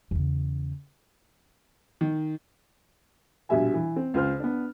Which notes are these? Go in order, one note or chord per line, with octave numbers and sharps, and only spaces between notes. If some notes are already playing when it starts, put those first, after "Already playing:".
E2 C#3
D#3
A#1 B2 G3 E5 G#5
E3
C4
C#2 F4 C5 F6
B3 D4